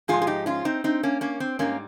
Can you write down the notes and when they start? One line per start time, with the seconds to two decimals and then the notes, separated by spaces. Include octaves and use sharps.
0.08 G#2 F3 G#3 F4 G#4
0.22 G#4
0.27 D#4 G4
0.46 C#4 F4
0.65 C4 D#4
0.84 C4 D#4
1.03 A#3 C#4
1.21 A#3 C#4
1.40 C4
1.59 G#2 G3 A#3 C#4